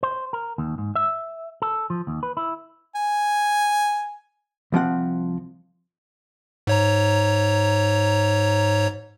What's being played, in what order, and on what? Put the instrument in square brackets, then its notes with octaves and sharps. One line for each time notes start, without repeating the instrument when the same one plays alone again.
[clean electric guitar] C5
A#4
D#2
G#2
E5
A4
F3
D#2
B4
E4
[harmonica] G#5
[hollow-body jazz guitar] C2 F3 C4 F#5
[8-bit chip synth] G#2 C#5 A#5